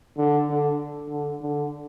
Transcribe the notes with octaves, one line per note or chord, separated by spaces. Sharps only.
D3
D3
D3
D3